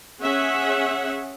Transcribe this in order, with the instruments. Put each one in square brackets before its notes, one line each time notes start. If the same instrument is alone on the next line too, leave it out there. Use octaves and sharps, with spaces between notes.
[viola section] C#4 G#4 E5 F#5